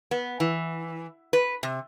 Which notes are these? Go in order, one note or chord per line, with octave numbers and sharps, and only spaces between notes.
B3
E3
B4
C3